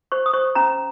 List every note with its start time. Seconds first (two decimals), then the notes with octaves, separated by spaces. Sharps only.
0.12 C5 C#6
0.26 D#6
0.33 C5 C#6
0.55 C#4 A#5